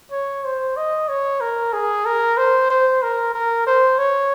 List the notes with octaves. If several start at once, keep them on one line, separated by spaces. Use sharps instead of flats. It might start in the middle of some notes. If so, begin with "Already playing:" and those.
C#5
C5
D#5
C#5
A#4
G#4
A#4
C5
C5
A#4
A#4
C5
C#5